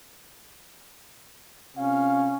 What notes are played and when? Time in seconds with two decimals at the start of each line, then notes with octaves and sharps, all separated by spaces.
1.77 C3 C#4 F4 F5